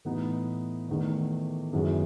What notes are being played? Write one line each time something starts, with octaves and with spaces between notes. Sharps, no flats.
A2 E3 B3 D#4
E2 D#3 A3
F#2 D#3 G#3 B3 E4